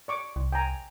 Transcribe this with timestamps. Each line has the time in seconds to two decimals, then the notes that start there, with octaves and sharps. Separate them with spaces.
0.08 D5 C#6 D6
0.36 C2
0.52 G5 G#5 A#5